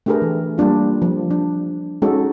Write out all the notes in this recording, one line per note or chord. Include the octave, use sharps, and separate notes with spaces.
A3 D4 G4 G#4 A#4 B4
E3
G3 A#3 D4 F4
F3
D4
G#3 C#4 D#4 F#4 A4